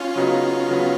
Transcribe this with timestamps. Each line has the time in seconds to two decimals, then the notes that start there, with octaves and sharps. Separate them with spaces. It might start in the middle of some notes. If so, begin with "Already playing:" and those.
Already playing: C#4 F4
0.16 C#3 F#3 B3 D#4 F#4
0.68 C#3 F#3 B3